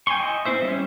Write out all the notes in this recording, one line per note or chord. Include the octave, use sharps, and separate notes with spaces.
G5 G#5 A#5 C6 C#6
E4 D#5
C4 E4 C5 E5
G3 C#4 E4